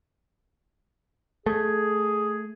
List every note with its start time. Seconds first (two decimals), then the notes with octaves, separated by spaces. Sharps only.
1.46 A3 G#4